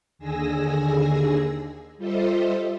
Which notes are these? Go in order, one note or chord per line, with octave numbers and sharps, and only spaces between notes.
D#2 D3 G#4 G#5 E6 A#6
G3 F4 A4 C5 D#5 E5